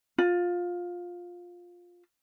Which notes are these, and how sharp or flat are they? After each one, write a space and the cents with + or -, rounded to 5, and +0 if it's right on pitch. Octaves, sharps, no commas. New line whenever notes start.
F4 +15